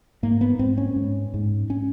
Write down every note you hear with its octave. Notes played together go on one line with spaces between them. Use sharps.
G#2 A#3
B3
G#2 C4
C#4
G#2
G#2
C#4